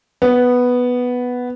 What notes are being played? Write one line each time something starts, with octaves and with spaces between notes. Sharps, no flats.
B3